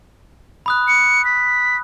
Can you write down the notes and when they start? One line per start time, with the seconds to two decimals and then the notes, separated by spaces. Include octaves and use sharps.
0.66 B5 D#6 F#6
0.88 C#7
1.25 B6